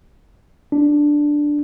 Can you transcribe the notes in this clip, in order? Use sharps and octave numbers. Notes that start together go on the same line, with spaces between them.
D4